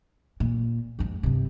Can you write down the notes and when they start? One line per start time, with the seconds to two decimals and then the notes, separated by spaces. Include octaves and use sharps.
0.40 A#2
0.99 F2 G#2
1.23 G2 C3